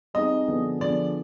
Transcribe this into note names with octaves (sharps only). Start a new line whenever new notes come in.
G3 C4 D#4 G#4 D#5
D3 F3 B3 D4 G#4
D3 F3 B3 D4 G#4 D5